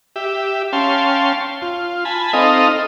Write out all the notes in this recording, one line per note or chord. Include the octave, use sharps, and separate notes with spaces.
G4 E5
C#4 F5 G5 A5 C6
F4
G#5 A5 B5
C4 D#4 A4 D#5 F5